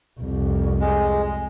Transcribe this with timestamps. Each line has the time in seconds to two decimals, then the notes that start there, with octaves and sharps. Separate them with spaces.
0.20 C2 F2
0.81 G#3